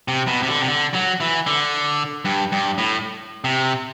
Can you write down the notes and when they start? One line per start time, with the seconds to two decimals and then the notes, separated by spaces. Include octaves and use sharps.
0.08 C3
0.27 B2
0.43 C3
0.48 D3
0.61 C3
0.68 D3
0.94 F#3
1.20 E3
1.47 D3
2.25 G2
2.52 G2
2.78 A2
3.44 C3